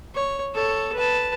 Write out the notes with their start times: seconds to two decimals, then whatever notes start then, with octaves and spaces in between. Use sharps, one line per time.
0.15 C#5
0.54 A4 C#5
0.95 B4 A5